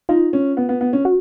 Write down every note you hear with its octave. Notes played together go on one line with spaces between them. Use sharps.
D#4 F4
C#4
B3
B3
B3
C#4
F#4